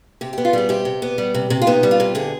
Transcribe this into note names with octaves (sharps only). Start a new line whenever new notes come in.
C3 G4
B3 G4
F4
G3 G#4
C3 G4
C3
B3
G3
C3
C3
F4
B3 D#4
G3
F4
C3
D3 G#4